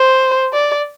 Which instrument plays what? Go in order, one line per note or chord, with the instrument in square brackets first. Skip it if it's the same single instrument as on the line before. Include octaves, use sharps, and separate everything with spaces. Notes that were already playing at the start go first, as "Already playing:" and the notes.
Already playing: [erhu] C5
D5